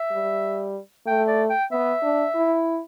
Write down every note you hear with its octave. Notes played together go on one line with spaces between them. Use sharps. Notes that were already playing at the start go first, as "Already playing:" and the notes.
Already playing: E5
G3
A3 G5
D5
G5
B3 E5
D4
E4